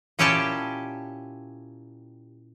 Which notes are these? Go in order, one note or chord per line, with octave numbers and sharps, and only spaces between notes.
A#2 C#4 E4 G4 G5 A5